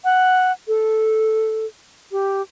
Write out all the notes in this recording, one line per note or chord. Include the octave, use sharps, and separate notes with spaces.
F#5
A4
G4